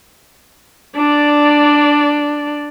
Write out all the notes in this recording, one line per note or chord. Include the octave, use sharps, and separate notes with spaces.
D4 D5